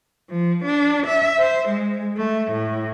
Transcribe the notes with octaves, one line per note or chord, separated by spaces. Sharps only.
F3
D4
E5
C5
G#3
A3
A2